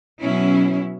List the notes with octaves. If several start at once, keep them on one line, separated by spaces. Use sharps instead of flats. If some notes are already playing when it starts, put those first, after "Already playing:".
B2 F#3 C#4 E4